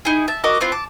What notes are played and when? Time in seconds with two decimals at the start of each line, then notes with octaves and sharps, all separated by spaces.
0.05 D#4 E4 G#4
0.28 E5 A5
0.44 F#4 A#4 D#5 D6
0.61 B3 C4 E4 F4
0.72 A5 D6